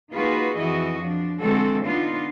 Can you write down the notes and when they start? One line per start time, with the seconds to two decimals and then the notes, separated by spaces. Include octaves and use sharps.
0.13 A#3 D#4 F4 F#4 G#4 B4
0.58 F2 E3 E4 F#4 D#5
1.01 F3 D4
1.40 D3 E3 G#3 C4 F#4 A4
1.86 B3 D4 D#4 F4